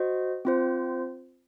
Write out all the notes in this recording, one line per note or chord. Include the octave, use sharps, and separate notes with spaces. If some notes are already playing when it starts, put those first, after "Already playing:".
Already playing: F#4 C5 D#5
C4 F4 C5